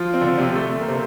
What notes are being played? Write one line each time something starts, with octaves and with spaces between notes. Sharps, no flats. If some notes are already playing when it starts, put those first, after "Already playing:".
Already playing: F3 F4
C4
D3 D4
C3 C4
A3
A#3
C3 C4